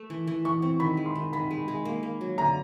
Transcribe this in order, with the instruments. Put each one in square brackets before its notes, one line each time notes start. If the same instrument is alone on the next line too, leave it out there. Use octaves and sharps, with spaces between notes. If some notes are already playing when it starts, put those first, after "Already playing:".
Already playing: [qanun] A3
E3
E3
[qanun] E3 [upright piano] C#6
[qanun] C4
[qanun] D#3 [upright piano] B5
[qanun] G#3
[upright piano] C6
[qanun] D#3
[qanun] D#3 [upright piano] B5
[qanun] G#3
G#3
A#3
A#3
F#3
[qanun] D3 [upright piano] A#5